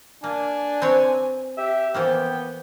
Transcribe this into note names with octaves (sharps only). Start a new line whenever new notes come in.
A#3 D4 G#5
C4 B4 C#5
G4 E5
E3 F3 A#3 B3 G5